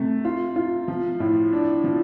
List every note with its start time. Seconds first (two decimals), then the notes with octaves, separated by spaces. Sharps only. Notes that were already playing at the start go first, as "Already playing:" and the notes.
Already playing: C3 A3
0.25 F4
0.56 F4
0.88 F3
1.20 A2
1.53 D4
1.84 F3